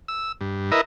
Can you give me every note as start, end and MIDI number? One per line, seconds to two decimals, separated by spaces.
0.08 0.32 88
0.41 0.71 43
0.72 0.81 64
0.72 0.81 70
0.72 0.81 71
0.72 0.81 75
0.72 0.81 76